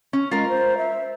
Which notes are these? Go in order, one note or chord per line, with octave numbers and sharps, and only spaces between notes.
C#4
G#3 F4 A#4
C5
E5